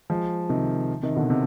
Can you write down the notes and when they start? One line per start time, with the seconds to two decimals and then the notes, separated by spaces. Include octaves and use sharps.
0.10 F3 G#3
0.49 C3 D#3
1.03 C3 D#3
1.16 B2 D3
1.30 C3